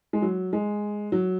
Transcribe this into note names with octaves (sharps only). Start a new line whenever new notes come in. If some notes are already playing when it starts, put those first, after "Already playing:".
G#3
F#3
G#3
F#3